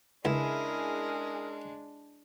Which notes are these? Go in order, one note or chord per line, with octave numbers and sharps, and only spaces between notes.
C#2 G#3 C#4 D4 E4 G#4 A#4